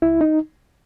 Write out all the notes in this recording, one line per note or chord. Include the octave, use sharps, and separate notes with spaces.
C#2 E4
D#4